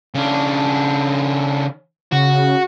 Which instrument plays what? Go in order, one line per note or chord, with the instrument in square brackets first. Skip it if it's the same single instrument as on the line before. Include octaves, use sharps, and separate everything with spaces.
[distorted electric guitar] C#3 D4
[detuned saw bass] C#3 [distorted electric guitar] F#4